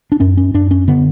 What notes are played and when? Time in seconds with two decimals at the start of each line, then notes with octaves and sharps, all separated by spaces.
0.12 D4
0.20 F#2 C#4
0.37 C#4
0.54 F#2 D4
0.71 C#4
0.88 D3 B3